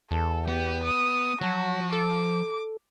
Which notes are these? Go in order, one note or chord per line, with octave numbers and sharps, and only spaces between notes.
E2 A4
B3 G4
D#6
F3 F#3 F#4 A5
A4 D6